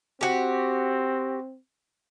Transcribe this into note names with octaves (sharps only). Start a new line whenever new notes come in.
C4 F#4 G4